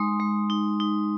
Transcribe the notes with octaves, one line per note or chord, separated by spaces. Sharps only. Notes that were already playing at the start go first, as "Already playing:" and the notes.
Already playing: G#3 D#4 C6 D#6
G#3
D#4
D#4